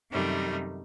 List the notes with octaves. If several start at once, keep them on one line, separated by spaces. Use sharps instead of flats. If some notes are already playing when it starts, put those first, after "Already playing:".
F#2 C3 D#3 G3 A3 D#4